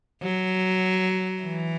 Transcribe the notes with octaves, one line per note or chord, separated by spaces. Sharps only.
F#3
E3